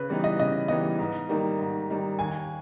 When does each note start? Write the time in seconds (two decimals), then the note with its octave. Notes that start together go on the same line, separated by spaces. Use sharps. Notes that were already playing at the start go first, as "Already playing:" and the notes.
Already playing: C#3 B4
0.09 E3 G3 B3 D#4
0.24 D#5
0.40 C#3 D#5
0.68 E3 G3 B3 D#4 D#5
0.99 G#2
1.29 D#3 G3 A#3 D#4
1.59 G#2
1.90 D#3 G3 A#3 D#4
2.19 D#2 G#5